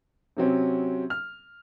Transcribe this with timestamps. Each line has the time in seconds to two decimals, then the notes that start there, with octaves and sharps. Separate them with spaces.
0.37 C3 F#3 C4 C#4
1.10 F6